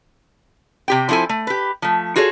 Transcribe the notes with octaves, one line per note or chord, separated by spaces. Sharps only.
C3 G4 G5
F3 C4 E4 A4 G#5
A3
G4 B4
F3 A3
F4 F#4 G#4 A4 C5 C#5